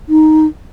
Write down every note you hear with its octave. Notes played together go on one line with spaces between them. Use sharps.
D#4